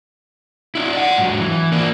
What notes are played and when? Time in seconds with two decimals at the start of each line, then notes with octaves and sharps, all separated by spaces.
0.75 D4 E4
0.93 D5 F#5
1.17 G#2 F#3
1.39 E3
1.72 A#3 D4